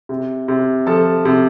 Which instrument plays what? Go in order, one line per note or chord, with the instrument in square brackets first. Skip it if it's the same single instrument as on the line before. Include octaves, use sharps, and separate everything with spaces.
[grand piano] C3
C3
F3 A4 A5
C3